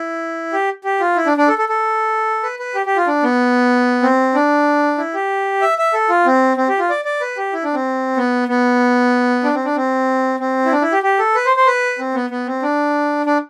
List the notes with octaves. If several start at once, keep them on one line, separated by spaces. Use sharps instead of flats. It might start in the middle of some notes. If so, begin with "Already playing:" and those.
Already playing: E4
G4
G4
F4
E4
D4
D4
A4
A4
A4
B4
B4
G4
G4
F4
D4
B3
C4
D4
E4
G4
E5
E5
A4
F4
C4
C4
G4
F4
D5
D5
B4
G4
E4
D4
C4
B3
B3
D4
C4
D4
C4
C4
E4
D4
E4
G4
G4
A4
B4
C5
C5
B4
C4
B3
B3
C4
D4
D4